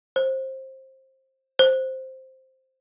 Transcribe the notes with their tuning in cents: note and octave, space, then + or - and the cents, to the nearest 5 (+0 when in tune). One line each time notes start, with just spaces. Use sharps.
C5 +20
C5 +0